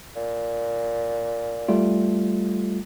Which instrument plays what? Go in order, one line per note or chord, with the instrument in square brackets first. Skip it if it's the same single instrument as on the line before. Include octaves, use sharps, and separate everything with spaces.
[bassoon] A#2
[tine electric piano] G3 A3 F4